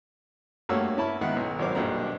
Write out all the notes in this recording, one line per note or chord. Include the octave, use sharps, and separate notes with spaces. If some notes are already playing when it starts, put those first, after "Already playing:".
G2 A3 A#3 F#4 C#5 E6
C#4 E4 A5 B5
G#2 D#3 B3 E5 F#5
B1
G#1 F#3 A#4 C5 D6
A#1 G2 B2 D4 A4 A#5